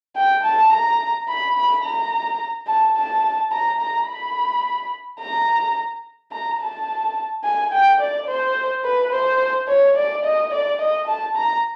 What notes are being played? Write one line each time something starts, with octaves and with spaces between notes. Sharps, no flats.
G5
A5
A#5
B5
B5
A#5
A5
A5
A#5
A#5
B5
A#5
A#5
A5
G#5
G5
D5
C5
B4
C5
C#5
D5
D#5
D5
D#5
A5
A#5